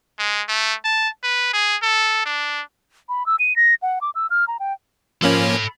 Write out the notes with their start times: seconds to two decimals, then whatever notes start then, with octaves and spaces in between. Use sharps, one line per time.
0.19 G#3
0.48 A3
0.84 A5
1.23 B4
1.53 G#4
1.83 A4
2.26 D4
3.09 B5
3.26 E6
3.39 D#7
3.56 A#6
3.82 F#5
4.01 D6
4.15 E6
4.30 F6
4.48 A#5
4.60 G5
5.22 F3 A#3 C#4 A4 B5